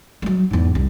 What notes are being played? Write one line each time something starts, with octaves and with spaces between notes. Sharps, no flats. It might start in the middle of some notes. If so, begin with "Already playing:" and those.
F#3 G#3
E2 G#2
C2